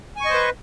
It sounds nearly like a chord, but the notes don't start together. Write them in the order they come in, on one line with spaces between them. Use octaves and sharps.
G#5 C#6 D#5 C5 B4